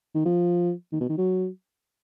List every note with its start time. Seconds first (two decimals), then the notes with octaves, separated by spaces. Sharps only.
0.15 D#3
0.25 F3
0.92 D#3
1.01 B2
1.09 D#3
1.18 F#3